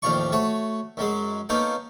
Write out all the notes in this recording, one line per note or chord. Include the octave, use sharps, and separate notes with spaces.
A1 D#2 F3 F4 D5 C#6
A3 F#4 C#5
F#2 F#3 G#3 C6
A#3 B3 C#4 D#4 A4 G5